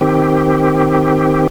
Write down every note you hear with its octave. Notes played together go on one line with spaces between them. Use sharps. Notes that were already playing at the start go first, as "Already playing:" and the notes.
D#3 C4 G4